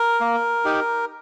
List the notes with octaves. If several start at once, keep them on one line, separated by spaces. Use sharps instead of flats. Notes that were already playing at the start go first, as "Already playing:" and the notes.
Already playing: A#4
A#3
D#4 G4